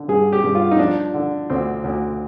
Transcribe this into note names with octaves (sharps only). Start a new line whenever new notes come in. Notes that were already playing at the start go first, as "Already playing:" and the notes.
Already playing: D3
G2 G#4
G4
G2
F4
D#4
F3 D4
D3
D2 C4
D2